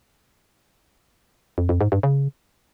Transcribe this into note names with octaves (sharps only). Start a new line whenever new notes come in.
F2
F2
G#2
G2
C#3